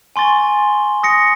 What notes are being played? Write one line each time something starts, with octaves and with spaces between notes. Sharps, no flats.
G#5 C6 C#6 A6 G7
D#6 A#6 C#7